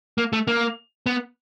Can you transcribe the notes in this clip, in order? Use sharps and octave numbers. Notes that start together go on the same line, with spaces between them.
A#3
A3
A#3
B3